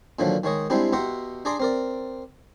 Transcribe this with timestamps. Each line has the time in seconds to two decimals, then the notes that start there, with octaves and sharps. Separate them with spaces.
0.19 A#2 D3 D#3 F3 F#3
0.44 D#3 G#3 C#5 D#5
0.70 G3 G#3 C4 D4 E4 G4
0.93 B2 G4 E5 F#5 A#5 C6
1.45 D4 G#4 D5 A#5 C6 D6
1.60 C4 A#4 D5